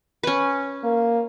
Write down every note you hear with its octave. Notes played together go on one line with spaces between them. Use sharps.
C#4 B4
A#3